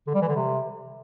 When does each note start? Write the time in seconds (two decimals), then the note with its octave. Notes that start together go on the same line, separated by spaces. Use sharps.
0.07 D3
0.14 G3
0.21 E3
0.29 D3
0.36 C3